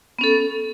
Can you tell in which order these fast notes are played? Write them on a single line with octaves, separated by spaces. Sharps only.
B3 C#4 A4